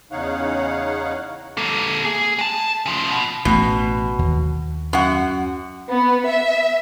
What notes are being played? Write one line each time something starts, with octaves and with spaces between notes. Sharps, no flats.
E2 C#3 D#4 C#5 F5 F#5
A#3 A4
G#4
G#3 A5
C#3 F3
B2
A1 B2 A3
D#2
F#2 F#5
B3
E5